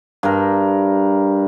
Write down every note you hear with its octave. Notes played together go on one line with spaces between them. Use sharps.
G2 A#4